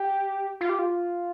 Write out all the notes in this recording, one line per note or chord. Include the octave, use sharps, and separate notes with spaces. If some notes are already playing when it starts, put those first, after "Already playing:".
Already playing: G4
F4
G4
F4